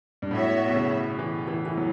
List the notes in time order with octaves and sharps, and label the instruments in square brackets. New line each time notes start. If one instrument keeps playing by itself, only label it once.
[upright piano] G2
[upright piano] A2 [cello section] F#3 B3 F#4 C#5 E5
[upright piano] B2
C#3
E3
E3
E3
F#3